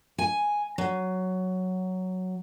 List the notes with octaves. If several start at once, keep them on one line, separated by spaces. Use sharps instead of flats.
G#5
F#3